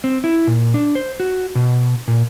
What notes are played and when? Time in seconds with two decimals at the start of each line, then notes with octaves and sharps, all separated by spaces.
0.04 C4
0.24 E4
0.47 A#2
0.74 D4
0.95 C5
1.20 F#4
1.55 B2
2.08 A#2